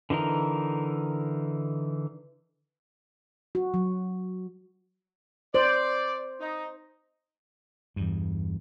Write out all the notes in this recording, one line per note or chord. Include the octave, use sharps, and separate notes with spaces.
D3 E3 D#4 A#4
F#4
F#3
C5 D5
D#4
E2 G2